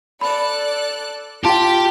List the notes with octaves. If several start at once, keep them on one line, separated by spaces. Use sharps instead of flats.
A4 D5 B5 F#6
F4 G4 G5 A5 B6